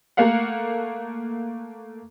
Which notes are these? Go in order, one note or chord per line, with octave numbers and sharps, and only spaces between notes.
A3 A#3 A#4 F5 F#5